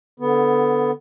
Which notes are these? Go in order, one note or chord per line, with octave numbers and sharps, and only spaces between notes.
D3 B3